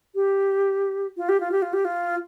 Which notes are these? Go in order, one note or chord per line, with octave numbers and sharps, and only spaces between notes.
G4
F4
G4
F4
G4
F4
G4
F4